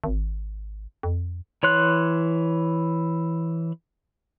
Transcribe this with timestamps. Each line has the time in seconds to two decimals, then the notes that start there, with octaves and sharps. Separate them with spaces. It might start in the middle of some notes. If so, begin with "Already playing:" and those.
0.04 G#1
1.03 F2
1.63 E3 C#5 C6 F#6